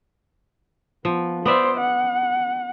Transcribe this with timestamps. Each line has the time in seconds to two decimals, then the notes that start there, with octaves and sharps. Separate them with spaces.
1.05 F3 B3
1.46 B3 C5 D5 E5
1.80 F#5